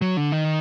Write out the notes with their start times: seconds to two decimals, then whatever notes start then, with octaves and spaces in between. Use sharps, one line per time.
0.02 F#3
0.17 D3
0.32 D#3